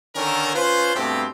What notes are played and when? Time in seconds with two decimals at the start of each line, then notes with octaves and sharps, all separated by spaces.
0.15 D3 D#3 C#4 D4 A4 A#4
0.55 C#4 F4 B4 C5
0.95 G2 B2 A3 C4 G4